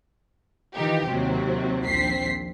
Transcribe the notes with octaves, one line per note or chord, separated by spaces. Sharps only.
D#3 E3 D#4 F4 G4
D#2 C3 F#3 C4
A#1 D#2 C4 B6 C7